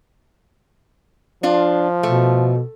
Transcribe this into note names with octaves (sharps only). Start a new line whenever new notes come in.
F3 D4 F4
B2 A3